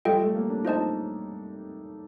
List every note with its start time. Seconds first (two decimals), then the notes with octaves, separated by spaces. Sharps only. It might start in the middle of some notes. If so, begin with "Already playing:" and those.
0.05 G3 F4 A4 D#5 G5
0.21 A3
0.35 A#3
0.50 D4
0.65 D#4 F4 C5 D#5 A5